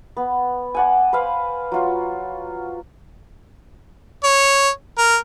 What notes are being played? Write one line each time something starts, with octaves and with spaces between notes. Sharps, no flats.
B3
D5 F#5 G#5
B4 C5 F5 B5
F#3 F4
C#5
A#4